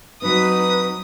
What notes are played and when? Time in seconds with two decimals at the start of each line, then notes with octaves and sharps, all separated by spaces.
0.22 F#3 C4 D#4 B4 D#6